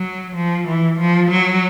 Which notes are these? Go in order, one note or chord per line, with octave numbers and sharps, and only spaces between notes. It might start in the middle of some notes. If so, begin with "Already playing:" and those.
Already playing: F#3
F3
E3
F3
F#3